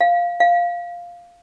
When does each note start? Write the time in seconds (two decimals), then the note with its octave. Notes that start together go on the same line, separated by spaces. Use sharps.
0.01 F5
0.40 F5